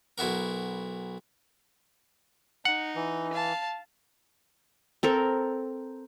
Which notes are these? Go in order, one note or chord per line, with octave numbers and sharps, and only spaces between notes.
B1 E4 F#4 A#4
D#4 F#5
E3
F5 A5
C4 A4 A#4